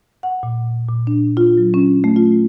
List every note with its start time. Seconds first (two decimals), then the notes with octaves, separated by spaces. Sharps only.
0.23 F#5
0.43 A#2
0.89 A#2
1.07 D4
1.37 F4
1.58 F#3
1.74 C#4
2.04 A3
2.16 F4